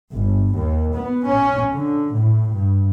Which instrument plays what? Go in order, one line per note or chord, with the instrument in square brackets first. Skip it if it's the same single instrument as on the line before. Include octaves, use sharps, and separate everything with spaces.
[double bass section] G1
D#2
B3
C#4
D3
A2
G2